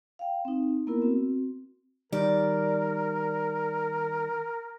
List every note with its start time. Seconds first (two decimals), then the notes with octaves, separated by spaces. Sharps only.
0.19 F5 G5
0.45 C4 D#4
0.87 A#3 B3 E4 A#4
1.02 C4 F#4
2.12 D#3 G3 A#4 D5